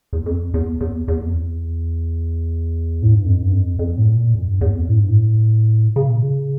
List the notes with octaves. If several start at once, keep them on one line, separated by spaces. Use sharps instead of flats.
E2
F2
E2
E2
E2
F2
E2
A2
G2
F2
G2
F2
F2
A2
A#2
F2
G2
E2
F2
A2
G2
A2
C#3
A#2
C#3